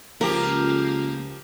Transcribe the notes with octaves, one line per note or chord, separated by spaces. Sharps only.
C#2 F3 A#3 G4 A#4